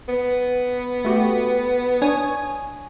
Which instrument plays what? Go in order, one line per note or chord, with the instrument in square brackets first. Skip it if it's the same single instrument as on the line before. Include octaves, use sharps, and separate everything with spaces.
[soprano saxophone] B3
[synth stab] A3 F#4 G4
[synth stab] D4 C#5 D#6 [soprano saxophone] G#5